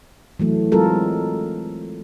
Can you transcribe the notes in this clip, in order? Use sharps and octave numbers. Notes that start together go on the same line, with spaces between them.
E3 F#3 A3
F#3 G#3 C4 F4 A4 A#4